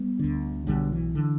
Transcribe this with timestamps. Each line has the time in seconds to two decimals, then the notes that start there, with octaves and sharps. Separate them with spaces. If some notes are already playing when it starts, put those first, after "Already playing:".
Already playing: G3 B3
0.19 D2 D3
0.67 B1 B2 D3 G3
0.92 E3
1.15 D3